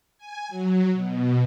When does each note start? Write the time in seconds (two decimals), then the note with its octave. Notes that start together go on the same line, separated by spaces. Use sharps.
0.18 G#5
0.49 F#3
0.94 B2